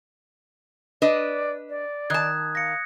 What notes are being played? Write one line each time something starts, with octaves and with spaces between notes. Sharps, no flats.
D4 B4 D5 D#5
D5
D#3 A5 D#6 F#6 G#6
F5 A#6 C#7